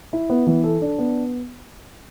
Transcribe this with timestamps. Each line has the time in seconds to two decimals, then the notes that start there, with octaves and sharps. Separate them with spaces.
0.13 E4
0.30 B3
0.47 E3
0.64 A4
0.82 D4
0.98 B3